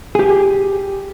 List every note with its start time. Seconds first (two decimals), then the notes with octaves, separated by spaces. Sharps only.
0.15 G4 G#4